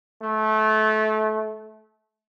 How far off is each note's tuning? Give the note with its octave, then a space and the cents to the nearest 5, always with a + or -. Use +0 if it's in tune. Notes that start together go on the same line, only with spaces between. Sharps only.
A3 -25